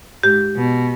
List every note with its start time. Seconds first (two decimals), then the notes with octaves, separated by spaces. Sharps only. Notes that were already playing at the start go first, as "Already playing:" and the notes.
0.23 G#2 G4
0.56 B2